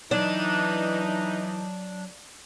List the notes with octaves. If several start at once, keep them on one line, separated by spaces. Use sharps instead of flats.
E3 F#3 D4 D#4